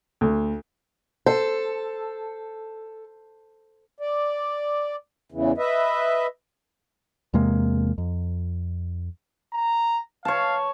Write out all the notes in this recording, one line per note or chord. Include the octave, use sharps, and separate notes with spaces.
D2
A4 C5
D5
E2 C#3 E3
B4 D#5 E5
E2 C3 G#3 A#3
F2
A#5
C#5 F5 A5